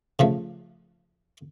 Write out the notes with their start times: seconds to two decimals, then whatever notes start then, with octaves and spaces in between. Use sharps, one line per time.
0.19 C#3 F3 A3